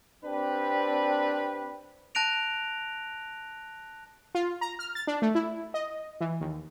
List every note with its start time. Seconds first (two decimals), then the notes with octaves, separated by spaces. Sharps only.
0.25 C4 D4 G4 B4
2.15 A5 F#6 A#6 D7 F7
4.35 F4
4.61 A#5
4.79 F6
4.95 A6
5.07 D4
5.22 A3
5.35 E4
5.74 D#5
6.21 E3
6.41 D#2